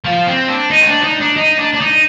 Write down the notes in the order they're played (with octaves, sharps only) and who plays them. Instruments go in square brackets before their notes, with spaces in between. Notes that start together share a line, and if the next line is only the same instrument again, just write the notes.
[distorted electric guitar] F3
C4
D4
D#4
C4
D4
D#4
D4
D#4
D4
D4
D#4